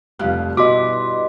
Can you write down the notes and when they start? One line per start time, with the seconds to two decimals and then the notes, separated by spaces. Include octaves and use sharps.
0.19 F1 G2 G3 F4 F5 F#6
0.57 B2 E4 F#4 B4 D#5 C6 D6